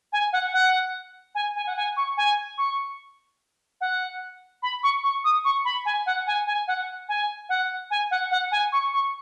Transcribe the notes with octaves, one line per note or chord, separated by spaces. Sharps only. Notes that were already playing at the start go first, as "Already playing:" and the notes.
G#5
F#5
F#5
G#5
G#5
F#5
G#5
C#6
G#5
C#6
F#5
B5
C#6
C#6
D#6
C#6
B5
G#5
F#5
G#5
G#5
F#5
G#5
F#5
G#5
F#5
F#5
G#5
C#6
C#6